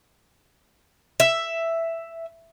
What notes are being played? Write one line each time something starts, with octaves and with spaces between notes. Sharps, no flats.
E5